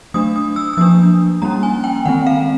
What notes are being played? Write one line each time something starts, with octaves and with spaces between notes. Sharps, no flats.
F#3 A3 D4 D#6
D#6
E6
E6
F3 A#3 D4 D#6
G3 A#3 C#4 A#5
G#5
G5
D#3 G#3 C4 F#5
F5